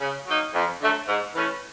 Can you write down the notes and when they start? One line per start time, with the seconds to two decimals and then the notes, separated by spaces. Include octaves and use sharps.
0.01 C#3
0.27 F#3 A#3 D#4
0.54 F2
0.81 D3 F#3 A3
1.08 G#2
1.35 E3 A3 C#4